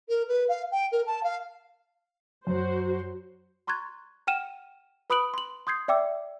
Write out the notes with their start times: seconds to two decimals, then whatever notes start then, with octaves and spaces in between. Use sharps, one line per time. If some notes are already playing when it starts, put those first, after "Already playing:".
0.08 A#4
0.27 B4
0.48 F5
0.71 G5
0.91 A#4
1.06 A5
1.23 F5
2.47 F#2 F#4 C5
3.67 A#5 C6 C#6 F#6 G#6 A6
4.27 F#5 G5 F6 D#7 E7
5.10 B4 B5 D#6 F#6 D7 F#7
5.34 C6 F#7
5.67 C6 D#6 G6 G#6 C7
5.88 D5 E5 G5 D6 E6